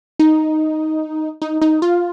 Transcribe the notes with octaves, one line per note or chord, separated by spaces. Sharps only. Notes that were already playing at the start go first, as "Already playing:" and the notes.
D#4
D#4
D#4
F4